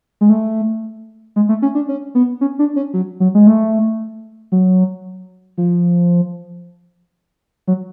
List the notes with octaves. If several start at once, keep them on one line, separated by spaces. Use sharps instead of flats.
G#3
A3
G#3
A3
C#4
D4
C#4
B3
C#4
D4
C#4
F#3
F#3
G#3
A3
F#3
F3
F#3